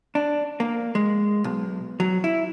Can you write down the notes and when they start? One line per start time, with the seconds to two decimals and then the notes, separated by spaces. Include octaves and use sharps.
0.15 D4
0.60 A#3
0.95 G#3
1.44 B1
2.00 F#3
2.24 E4